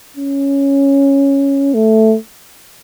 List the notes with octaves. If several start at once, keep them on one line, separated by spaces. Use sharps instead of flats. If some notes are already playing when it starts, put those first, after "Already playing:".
C#4
A3